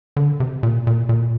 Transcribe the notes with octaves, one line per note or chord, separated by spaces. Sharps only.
D3
C3
A#2
A#2
A#2